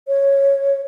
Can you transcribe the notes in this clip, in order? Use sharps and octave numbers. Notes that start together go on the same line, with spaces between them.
C#5